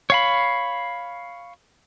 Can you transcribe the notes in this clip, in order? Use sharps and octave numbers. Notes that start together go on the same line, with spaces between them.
C#5 F5 B5